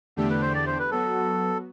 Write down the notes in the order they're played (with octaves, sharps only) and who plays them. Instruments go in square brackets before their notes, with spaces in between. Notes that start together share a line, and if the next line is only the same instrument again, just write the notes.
[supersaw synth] E2 D3 A3 D4 G4 [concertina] A4
[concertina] B4
C5
D5
C5
B4
[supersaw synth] F#3 B3 F#4 [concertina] A4